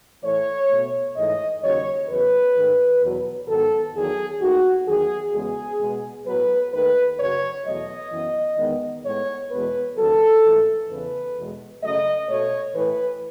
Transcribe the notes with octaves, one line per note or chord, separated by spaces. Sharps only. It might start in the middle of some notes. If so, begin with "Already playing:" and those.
A2 E3 A3 C#5
B2 A3
G#2 E3 A3 D#5
D#2 C#3 F#3 C#5
E2 C#3 F#3 B4
G#2 D#3 A3
E2 B2 F#3
G#2 D#3 F#3 B3 A4
E2 D#3 F#3 G#4
D#2 D#3 A3 F#4
E2 D#3 F#3 G#4
E2 C#3 G#3 B3 G#4
B2 G#3 B3
A2 F#3 B3 B4
D#2 D#3 A3 B4
F#2 C#3 F#3 C#5
E2 B2 F#3 A3 D#5
F#2 E3 B3
E2 D#3 G#3 B3
A2 G#3 B3 C#5
E2 B2 G#3 B3 B4
D#2 C#3 F#3 A4
G#2 E3 A3
E2 C#3 E3 B4
E2 B2 G#3
F#2 C#3 F#3 A3 D#5
B2 A3 C#5
A2 E3 A3 B4